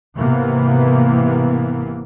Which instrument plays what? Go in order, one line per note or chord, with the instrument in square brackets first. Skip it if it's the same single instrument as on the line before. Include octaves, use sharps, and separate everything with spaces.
[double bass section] G#1 C3 E3 A#3 B3